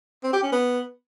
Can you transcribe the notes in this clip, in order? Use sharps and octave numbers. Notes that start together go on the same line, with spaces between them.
C4
G4
C#4
B3